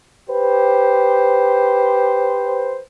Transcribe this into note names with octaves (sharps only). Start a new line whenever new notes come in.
G4 B4 C5